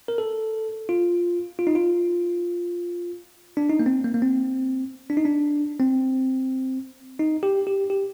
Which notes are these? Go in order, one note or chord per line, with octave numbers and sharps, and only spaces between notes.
A#4
A4
F4
F4
D#4
F4
D4
D#4
A#3
C4
A#3
A#3
C4
D4
D#4
D4
C4
D#4
G4
G4
G4